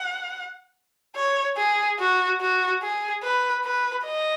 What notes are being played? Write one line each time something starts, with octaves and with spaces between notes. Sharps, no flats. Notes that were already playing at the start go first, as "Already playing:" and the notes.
Already playing: F#5
C#5
G#4
F#4
F#4
G#4
B4
B4
D#5